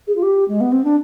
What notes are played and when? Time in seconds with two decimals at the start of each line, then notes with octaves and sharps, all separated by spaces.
0.07 G#4
0.16 F4
0.23 G4
0.48 G#3
0.61 B3
0.72 C4
0.84 D4